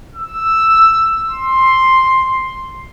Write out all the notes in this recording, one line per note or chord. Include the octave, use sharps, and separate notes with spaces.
E6
C6